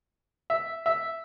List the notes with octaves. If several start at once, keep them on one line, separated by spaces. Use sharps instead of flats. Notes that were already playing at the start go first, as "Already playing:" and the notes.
E5
E5